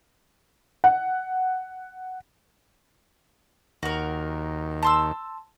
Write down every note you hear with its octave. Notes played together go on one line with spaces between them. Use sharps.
F#5
D#2 F#4 A#4
A5 C6 E6